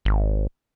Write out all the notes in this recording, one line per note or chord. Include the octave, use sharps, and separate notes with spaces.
G#1